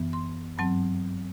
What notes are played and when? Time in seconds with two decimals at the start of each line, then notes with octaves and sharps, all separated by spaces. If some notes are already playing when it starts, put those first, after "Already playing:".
Already playing: F#2 E3 B3
0.13 C6
0.58 G2 F#3 C4 A5